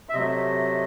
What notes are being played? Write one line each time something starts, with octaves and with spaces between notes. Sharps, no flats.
E5
C3 F#3 A3 D#5